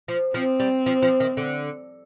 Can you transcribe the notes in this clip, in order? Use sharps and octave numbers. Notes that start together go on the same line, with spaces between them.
F3
F3 C4
G3
F3
F3
D#3
D3